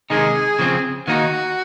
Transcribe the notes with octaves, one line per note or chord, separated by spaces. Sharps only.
C3 D#3 G#3 D#4 G#4
C#3 F3 C4
D#3 A#3 D#4 F#4